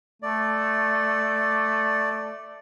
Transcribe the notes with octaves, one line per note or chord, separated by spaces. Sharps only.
A3 D5